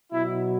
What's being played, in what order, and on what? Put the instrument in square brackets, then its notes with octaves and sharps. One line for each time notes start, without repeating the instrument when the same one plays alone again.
[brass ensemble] B2 F#3 E4